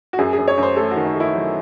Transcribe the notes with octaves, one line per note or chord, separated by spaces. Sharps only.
F#4
F#2 G#4
G#4
F#2
C#5
F#2
C5
A3 A4
F#4
D#3
D#4
A3 E4
F#3